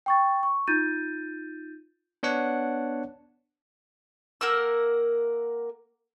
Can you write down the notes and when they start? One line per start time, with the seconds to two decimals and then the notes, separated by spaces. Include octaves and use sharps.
0.06 G5 C#6 A6
0.43 C#6
0.68 D#4 F4 G6 A6 D#7
2.23 B3 D4 C#5 F#5
4.41 A#3 A#4 F#5 E6